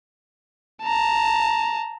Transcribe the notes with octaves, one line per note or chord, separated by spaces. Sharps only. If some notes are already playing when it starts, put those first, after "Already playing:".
A5 A#5